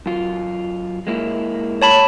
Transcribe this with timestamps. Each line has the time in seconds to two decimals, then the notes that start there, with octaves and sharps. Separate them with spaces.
0.06 F#2 F4
1.07 G#3 A#3 E4
1.82 C#5 A5 B5